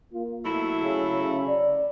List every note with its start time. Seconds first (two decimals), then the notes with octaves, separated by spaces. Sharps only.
0.13 A#3 F4
0.45 B2 F#3 A3 E4
0.81 C#3
1.12 C#3
1.49 D5